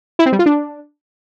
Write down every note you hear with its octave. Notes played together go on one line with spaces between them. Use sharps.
E4
C4
G3
F4
D4